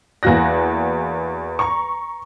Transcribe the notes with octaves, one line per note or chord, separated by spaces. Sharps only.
E2 A#3 F#4 F#6 A#6
A#5 C#6